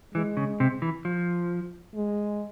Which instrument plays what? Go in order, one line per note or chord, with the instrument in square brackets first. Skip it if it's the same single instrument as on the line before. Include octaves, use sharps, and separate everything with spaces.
[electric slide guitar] E3 [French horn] G#3
[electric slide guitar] C#3
C3
E3
F3
[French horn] G#3